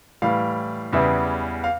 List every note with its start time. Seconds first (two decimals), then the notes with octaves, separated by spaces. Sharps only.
0.22 A2 E3 G3 F5
0.93 E2 C#3 E3 G3 E5
1.64 F5